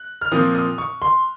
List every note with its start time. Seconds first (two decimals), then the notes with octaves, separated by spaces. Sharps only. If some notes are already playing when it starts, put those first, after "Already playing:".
Already playing: F#6
0.21 F6
0.31 A#2 F3 C4 D#6
0.55 D#6
0.78 C#6
1.02 C6